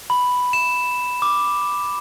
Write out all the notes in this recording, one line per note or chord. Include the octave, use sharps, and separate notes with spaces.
B5
E7
D6